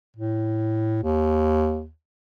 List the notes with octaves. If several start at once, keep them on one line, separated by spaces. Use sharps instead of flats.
A2
D#2